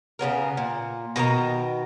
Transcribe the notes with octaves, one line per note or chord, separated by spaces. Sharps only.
C#3 F3 B3 A#4
A#2
B2 D#3 A#4 A#5